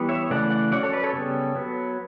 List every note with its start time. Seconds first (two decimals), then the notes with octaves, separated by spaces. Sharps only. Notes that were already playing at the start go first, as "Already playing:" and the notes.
Already playing: E3 G3 B3
0.09 C#5 E5
0.30 C#3 E3 A3 D5 F#5
0.51 D5 F#5
0.71 F#3 C#4 D5 F#5
0.83 A4 C#5
0.93 B4 D5
1.03 A4 C#5
1.13 C#3 G3 B3
1.55 F#3 B3